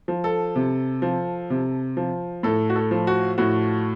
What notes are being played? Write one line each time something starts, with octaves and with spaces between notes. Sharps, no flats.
F3
A4
C3
F3
C3
F3
A2 A4
F#4
A4
F3
F#4
A2 F#4